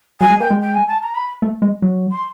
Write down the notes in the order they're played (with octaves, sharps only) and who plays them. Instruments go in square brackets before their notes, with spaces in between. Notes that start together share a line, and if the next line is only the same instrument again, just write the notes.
[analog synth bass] F#3 [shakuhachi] G#5
[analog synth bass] G#3
[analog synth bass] A#3 [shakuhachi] G5
[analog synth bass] G#3
[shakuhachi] G5
G#5
A5
A#5
B5
[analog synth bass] A3
G#3
F#3
[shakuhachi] C6